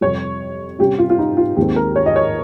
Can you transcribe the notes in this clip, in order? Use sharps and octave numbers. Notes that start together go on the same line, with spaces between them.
F2 C3 G3 C#5
C3 G3 C#4 G4
F4
F4
D#4
F4
D#2 D#3 G#3 C4 G4
A#4
C#5
D#5
C#5